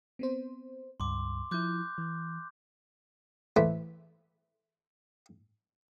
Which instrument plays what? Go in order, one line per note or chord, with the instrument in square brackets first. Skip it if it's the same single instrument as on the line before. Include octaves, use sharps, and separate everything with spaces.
[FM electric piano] B3 C4 C5
[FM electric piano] C#2 G2 [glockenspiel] C6 D6
[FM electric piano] F3 E4 [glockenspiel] D6 F#6 G6
[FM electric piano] E3
[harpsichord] E3 A3 C5 D5 B5 D6